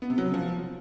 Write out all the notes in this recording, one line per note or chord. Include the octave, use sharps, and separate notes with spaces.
B3
C3
F#3
C#3
F3